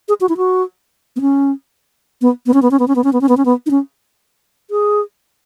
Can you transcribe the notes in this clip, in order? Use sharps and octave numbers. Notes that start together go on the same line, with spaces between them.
G#4
F#4
E4
F#4
B3
C#4
B3
B3
C#4
B3
C#4
B3
C#4
B3
C#4
B3
C#4
B3
C#4
B3
D#4
C#4
G#4